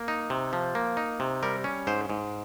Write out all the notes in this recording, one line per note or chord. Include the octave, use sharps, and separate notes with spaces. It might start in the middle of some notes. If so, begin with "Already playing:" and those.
Already playing: A#3
D#4
C3
F3
A#3
D#4
C3
G3 A#4
C#4
G#2 C5
G#2